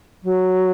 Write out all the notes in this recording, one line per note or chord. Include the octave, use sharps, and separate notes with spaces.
F#3